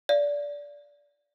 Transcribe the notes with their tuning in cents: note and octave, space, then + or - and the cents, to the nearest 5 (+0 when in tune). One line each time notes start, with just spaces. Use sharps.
D5 -15 F5 -25